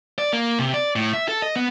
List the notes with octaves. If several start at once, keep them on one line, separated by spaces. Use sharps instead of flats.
D5
A#3
C3
D5
A2
E5
A4
D#5
B3